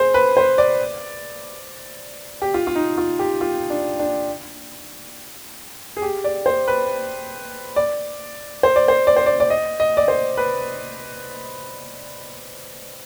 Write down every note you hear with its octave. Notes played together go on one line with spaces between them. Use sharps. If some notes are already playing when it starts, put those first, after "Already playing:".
Already playing: G#4 C5
B4
C5
D5
G4
F4
F4
D#4
F4
G4
F4
D4
D4
G#4
G4
D5
C5
B4
D5
C5
D5
C5
D5
C5
D5
D5
D#5
D#5
D5
C5
B4